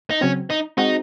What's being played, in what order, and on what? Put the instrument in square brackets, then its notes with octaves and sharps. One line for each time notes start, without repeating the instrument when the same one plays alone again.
[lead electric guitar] D#4
[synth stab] C#3 F#3 C4 [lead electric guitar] C#4
[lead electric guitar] D#4
[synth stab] G#3 C4 F#4 [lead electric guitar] D#4